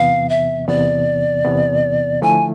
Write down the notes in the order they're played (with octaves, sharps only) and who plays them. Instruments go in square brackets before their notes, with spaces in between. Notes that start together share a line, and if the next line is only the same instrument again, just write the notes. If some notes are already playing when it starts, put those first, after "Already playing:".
Already playing: [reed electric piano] E2 C3 E3 B3 [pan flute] F5
[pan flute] E5
[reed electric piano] E2 C3 E3 B3 [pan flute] D5
[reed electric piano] E2 C3 E3 B3
[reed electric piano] D3 F3 A3 E4 [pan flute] G#5